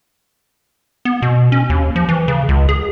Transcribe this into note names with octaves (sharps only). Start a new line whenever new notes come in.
B3
B2
C#4
D#2
F3
E3
C#3
C#2
G#4